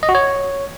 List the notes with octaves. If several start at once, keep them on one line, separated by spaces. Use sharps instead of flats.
D#5
F#4
C#5